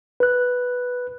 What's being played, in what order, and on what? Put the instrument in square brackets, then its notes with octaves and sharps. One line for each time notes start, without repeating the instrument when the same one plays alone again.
[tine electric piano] B4 F#6